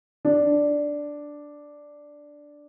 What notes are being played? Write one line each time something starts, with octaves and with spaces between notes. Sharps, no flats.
D4